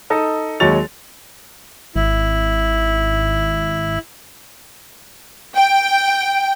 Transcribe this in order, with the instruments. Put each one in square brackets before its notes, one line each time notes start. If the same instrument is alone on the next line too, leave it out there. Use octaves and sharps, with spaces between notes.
[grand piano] D#4 A4 D#5
D#2 F#3 G#3 C#5 A6 F7
[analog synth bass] G#1 [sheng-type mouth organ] E4
[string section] G5